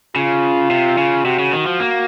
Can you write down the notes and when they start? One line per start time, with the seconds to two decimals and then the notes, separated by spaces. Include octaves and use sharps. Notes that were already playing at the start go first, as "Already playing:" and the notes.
0.16 C#3 F4
0.70 C3
0.98 C#3
1.25 C3 F#4
1.39 C#3
1.53 D#3
1.66 F3
1.80 A#3